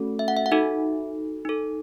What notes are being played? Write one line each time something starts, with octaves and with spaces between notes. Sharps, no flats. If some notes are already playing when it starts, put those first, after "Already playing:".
Already playing: A3 C#4 F#4 A4
E5
F#5
E5
F#5
D#4 F#4 A4 E5
D#4 A4